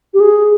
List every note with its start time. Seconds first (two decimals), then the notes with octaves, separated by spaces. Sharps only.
0.14 G4
0.20 G#4